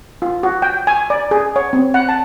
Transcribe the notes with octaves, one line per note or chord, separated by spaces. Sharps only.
F4
F#4
G5
G#5
D5
G#4
C#5
C4
F#5
A5